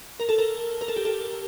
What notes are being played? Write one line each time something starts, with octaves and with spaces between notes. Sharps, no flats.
A#4
A4
A#4
A#4
A4
G4
A4